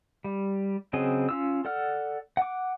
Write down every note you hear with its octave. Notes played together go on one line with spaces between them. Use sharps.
G3
C#3 F#3 C4 G#4 D#5
C#4 F4 E6
A4 D5 F#5 F6
F#5 D6